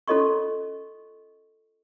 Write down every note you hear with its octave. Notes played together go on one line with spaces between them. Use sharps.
C#4 F4 A4 D#5 C6 C#6